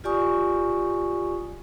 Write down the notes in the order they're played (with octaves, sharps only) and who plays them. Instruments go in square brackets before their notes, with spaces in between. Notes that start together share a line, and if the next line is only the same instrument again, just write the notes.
[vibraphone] F4 G4 D5 G#5 C#6 D#6